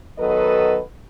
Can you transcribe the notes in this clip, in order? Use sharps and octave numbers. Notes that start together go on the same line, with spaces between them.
D#3 F#3 B3 A4 B4 D#5